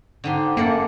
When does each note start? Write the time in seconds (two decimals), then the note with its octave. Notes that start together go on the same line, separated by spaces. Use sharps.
0.24 G#2 D3 G4 C6
0.57 F#2 A#3 A4 D5 F#5